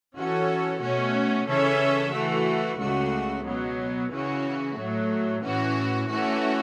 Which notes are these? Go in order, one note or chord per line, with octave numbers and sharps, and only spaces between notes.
E3 C#4 F#4 A4
B2 A3 C#4 F#4
C#3 E3 C#4 A4 E5
E3 A3 F#4
C#2 C#3 A3 F#4
B2 F#3 B3
C#3 E3 C#4 F#4
A2 F#3 A3
A2 E3 C#4 F#4
E3 A3 C#4 F#4